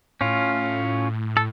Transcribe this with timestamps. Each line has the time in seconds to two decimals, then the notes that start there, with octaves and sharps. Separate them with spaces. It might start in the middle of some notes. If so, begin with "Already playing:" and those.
0.21 A2 C#4 F4
1.37 A4